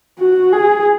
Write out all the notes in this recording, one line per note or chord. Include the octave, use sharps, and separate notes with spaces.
F#4
G#4